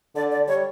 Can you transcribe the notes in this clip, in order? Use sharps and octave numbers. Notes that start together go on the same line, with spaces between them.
D3 D5
D5
G3 C#5